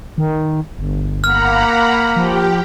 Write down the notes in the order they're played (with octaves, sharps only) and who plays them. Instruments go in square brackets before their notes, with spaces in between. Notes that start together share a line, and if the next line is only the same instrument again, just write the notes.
[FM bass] D#3
G1
[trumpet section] A#3 [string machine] F#5 A#5 B5 [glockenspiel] F6
[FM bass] F3 [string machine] G4 G5